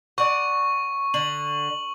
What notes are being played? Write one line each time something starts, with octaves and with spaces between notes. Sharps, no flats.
D5 F#5 C#6
D3 F#7